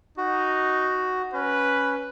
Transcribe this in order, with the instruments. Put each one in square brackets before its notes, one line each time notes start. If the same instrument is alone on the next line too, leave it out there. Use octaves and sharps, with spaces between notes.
[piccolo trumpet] D#4 [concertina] F#4
[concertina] C#4 [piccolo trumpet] B4